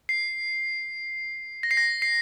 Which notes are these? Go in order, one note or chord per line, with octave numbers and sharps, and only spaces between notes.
C7
A#6
C7
A#6
C7